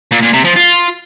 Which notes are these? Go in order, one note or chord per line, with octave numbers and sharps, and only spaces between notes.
A#2
A#2
C3
F3
F4